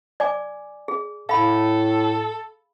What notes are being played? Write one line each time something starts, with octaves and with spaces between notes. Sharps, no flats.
D5 G#5 D6
G#4
A2 A4 F5 B5